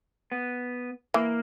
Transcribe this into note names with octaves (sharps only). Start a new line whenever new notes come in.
B3
E3 A#3